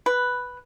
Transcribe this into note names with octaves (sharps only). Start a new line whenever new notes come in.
B4